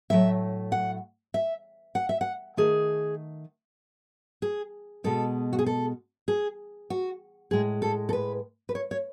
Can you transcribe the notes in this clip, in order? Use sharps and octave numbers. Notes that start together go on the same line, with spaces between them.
A2 F#3 A3 E5
F#5
E5
F#5
E5
F#5
D#3 A3 G#4
G#4
B2 G#3 A4
F#4
G#4
A4
G#4
F#4
A2 G#3 G#4
A4
A4
B4
B4
C#5
C#5